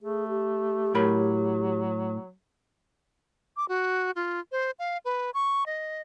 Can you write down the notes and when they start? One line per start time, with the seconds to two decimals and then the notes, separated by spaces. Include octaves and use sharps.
0.03 A3 G#4
0.28 G4
0.95 A2 F#3 A#4 B5
3.57 D6
3.68 F#4
4.16 F4
4.52 C5
4.79 F5
5.05 B4
5.34 C#6
5.66 D#5